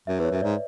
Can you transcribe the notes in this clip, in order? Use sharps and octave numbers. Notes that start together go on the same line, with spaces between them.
F#2 E5
E2 B4
C#5
F#2
E5
G#2 D5